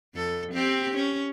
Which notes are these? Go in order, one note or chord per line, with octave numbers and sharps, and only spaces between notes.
F2 A4
C4 G4
C#4